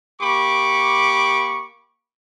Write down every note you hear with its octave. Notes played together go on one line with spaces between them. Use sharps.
A#3 G4 B5 C#6 D6